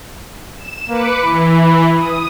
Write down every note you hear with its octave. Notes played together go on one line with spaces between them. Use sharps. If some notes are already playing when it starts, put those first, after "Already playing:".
E7
A#3 B4 D6 C#7
E3 B5
D#6